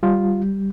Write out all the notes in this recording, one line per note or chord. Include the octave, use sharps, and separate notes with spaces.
G3 F4